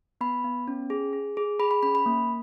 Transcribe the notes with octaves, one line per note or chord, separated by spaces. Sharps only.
B3 B5
B3
C#4
G#4
G#4
G#4
G#4 B5
B5
C#4 B5
B5
A#3